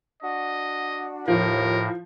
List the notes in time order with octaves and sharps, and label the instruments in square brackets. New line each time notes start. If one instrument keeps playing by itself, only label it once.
[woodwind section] D4 F#4 [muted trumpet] D#5
[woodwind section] D#2 [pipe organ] A2 [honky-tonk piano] F3 [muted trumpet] A#4